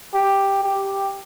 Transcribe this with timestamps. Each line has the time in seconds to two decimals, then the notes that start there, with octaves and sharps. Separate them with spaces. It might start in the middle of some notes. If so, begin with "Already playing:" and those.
0.14 G4
0.63 G4